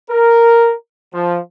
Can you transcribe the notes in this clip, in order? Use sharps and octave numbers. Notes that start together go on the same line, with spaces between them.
A#4
F3